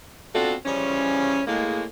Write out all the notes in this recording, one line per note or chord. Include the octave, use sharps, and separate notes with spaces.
B2 C4 D4 F4 F#4 A4
C#3 E3 F3 G3 C#4
A2 G#3 A#3